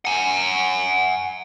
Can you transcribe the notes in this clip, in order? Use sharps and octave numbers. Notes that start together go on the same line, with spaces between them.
F#5 G#5